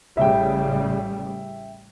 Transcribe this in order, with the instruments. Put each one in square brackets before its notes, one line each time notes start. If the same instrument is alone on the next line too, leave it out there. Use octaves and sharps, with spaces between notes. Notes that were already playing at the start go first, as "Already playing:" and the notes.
[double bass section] A1 C#3 G3 [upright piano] E5 G5